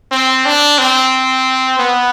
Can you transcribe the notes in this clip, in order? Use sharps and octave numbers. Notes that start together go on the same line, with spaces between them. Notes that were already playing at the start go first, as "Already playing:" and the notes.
C4
D4
C4
B3